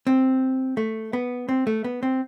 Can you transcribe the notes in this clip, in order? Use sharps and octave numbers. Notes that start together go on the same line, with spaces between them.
C4
A3
B3
C4
A3
B3
C4